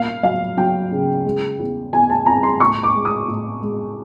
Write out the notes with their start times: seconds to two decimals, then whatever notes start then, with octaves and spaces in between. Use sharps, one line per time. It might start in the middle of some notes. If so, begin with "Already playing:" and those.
Already playing: A#2 A#3 F5
0.23 F#3 F5
0.57 F#3 G5
0.91 C#3
1.25 G#3
1.59 E2
1.93 E2 G#5
2.10 A5
2.26 C4 A#5
2.43 C6
2.60 A2 C#6
2.83 D6
2.94 G#3
3.05 D#6
3.28 A2
3.62 G#3